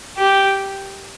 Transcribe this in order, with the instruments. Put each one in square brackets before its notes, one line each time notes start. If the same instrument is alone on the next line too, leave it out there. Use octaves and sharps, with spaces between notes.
[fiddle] G4